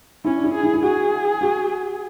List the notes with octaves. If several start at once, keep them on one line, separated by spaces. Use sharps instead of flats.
C#4 E4
D4
E4
G#4
E4
E4
F#4 G#4
F#4